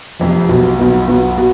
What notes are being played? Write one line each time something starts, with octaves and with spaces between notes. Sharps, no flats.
F1 F2 C3
B1 B2 B3
B1 B2 B3
B1 B2 B3
B2